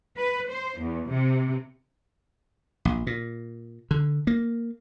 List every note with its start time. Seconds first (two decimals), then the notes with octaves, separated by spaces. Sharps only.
0.18 B4
0.50 C5
0.81 E2
1.10 C3
2.85 A#1
3.07 A#2
3.91 D3
4.27 A#3